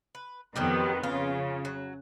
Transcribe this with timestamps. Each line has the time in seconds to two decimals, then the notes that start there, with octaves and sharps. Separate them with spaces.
0.15 B4
0.56 F2 D#3 F#3 G3 B3 G4
1.03 C#3 F4
1.65 F#3